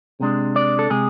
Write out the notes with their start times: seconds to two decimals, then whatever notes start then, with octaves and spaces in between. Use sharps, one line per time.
0.20 C3 G#3 D4
0.56 D5
0.79 A4
0.90 C3 G#3 G#4